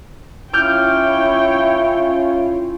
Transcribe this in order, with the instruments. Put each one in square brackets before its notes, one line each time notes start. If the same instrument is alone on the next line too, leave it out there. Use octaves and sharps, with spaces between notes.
[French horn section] C#4 F4 [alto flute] E4 [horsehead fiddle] C#5 G5 [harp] D6 F6 G6